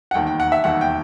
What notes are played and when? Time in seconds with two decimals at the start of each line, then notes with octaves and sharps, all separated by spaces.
0.11 F#5
0.14 E1 D#2 D#3 G5
0.27 G5
0.40 F#5
0.52 E5
0.64 E1 D#2 D#3 F#5
0.81 G5